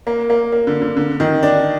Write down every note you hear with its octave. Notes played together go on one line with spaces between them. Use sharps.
A#3
A#3
A#3
D3
D3
D3
D#3
D4